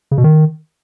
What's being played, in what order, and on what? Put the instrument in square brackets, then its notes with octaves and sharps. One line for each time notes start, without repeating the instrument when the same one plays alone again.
[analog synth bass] C#3
B2
D#3